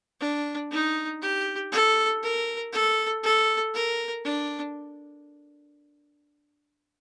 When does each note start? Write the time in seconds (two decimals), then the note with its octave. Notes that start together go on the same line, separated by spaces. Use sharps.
0.20 D4
0.71 D#4
1.22 G4
1.72 A4
2.23 A#4
2.72 A4
3.23 A4
3.74 A#4
4.25 D4